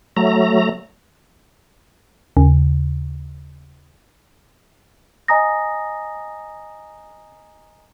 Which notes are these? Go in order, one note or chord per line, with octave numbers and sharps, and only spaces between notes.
F#3 A3 A#5
D#2 C#3
D#5 G#5 A#5 D#6 A#6